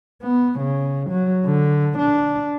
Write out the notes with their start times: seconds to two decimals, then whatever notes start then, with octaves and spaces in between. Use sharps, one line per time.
0.22 B3
0.60 C#3
1.10 F#3
1.45 D3
1.98 D4